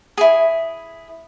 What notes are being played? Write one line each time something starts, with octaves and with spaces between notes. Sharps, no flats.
E4 G#4